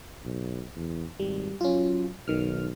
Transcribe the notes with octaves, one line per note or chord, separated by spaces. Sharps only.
B1
E2
G#1 G3
F#3 C#4 F4
B1 D#3 F6